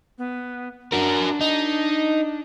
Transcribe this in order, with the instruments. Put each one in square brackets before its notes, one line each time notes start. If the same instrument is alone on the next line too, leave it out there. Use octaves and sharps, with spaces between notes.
[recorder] B3
[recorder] D4 [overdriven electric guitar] F#4 A#4
[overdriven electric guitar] D#4